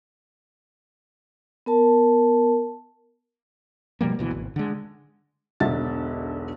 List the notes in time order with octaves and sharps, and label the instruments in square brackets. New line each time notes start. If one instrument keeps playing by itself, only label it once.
[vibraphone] B3 A#4 A5
[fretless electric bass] B2 F3 G3 A#3
D2 B2 E3
G#1
D3 G#3
[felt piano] E1 B1 D3 E5 A6